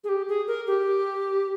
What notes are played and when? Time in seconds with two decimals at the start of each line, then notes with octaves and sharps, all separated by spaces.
0.04 G#4
0.09 G4
0.28 G#4
0.47 A#4
0.67 G4